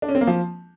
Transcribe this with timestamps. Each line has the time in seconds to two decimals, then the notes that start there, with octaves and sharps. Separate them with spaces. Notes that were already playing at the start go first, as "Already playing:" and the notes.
0.02 D4
0.09 C#4
0.15 C4
0.21 A#3
0.27 F3